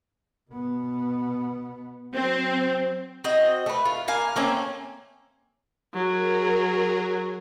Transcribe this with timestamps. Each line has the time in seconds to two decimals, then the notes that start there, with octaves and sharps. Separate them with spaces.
0.50 B2 B3
2.15 F#3 C4
3.24 C4 F#4 D#5
3.66 A3 B4
3.85 F4
4.08 A#3 F5 G#5
4.36 A3 A#3 C4 C#4
5.94 F#3 G#4 A#4